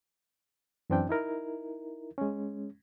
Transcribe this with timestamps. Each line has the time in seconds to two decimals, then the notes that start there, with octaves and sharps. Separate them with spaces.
0.90 F#2 E3 C4 D4 G5
1.09 D#4 E4 A#4
2.18 G#3 C#4